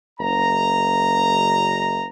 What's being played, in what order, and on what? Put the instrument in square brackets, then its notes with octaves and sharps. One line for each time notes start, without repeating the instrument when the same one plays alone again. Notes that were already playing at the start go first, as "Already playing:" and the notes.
[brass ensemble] F#1 A#5